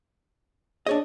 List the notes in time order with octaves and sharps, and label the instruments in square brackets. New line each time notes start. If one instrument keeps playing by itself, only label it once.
[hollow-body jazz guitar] D4 C#5 D#5 [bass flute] G#4